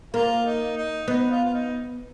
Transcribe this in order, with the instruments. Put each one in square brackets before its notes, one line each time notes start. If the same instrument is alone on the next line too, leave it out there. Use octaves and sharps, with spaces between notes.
[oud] A#3 [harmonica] F4
[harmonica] D#4
D#4
[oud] B3 [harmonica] D#4
[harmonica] F4
F4
D#4